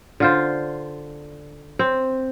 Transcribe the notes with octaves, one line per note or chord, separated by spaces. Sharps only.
D3 F4 C5
C4